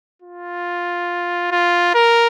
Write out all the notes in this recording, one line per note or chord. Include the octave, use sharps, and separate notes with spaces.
F4
F4
A#4